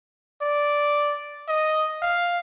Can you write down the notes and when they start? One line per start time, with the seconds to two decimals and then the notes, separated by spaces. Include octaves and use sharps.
0.42 D5
1.49 D#5
2.02 F5